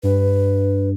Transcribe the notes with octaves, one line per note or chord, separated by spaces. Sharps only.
G2 B4